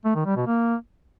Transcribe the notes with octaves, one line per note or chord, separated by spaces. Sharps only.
A3
D#3
G3
B2
A#3